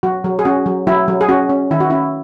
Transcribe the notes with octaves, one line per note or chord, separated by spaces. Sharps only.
F#3 F#4
F#3
G#4
C#4 F#4
F#3
F#3 E4
F#3
G#4
C#4 F#4
C#4
D#3 E4
F#4
C#4 E4